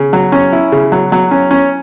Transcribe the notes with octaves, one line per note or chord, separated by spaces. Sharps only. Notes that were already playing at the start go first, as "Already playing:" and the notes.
Already playing: C#3
F#3
C#4
E4
C#3
F#3
F#3
C#4
C#4